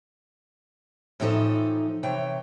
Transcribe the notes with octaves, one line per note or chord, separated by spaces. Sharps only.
A2 E3 F3 D#4 A4 D#5
C3 E3 C#5 G5